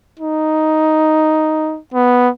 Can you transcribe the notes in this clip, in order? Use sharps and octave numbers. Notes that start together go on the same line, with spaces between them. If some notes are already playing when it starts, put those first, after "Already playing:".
D#4
B3